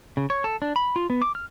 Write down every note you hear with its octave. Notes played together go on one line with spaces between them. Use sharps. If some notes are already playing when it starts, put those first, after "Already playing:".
C#3
C#5
A4
D4
B5
F4
B3
D6
F6